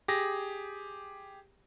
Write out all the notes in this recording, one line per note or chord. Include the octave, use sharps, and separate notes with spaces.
G4 G#4 A#6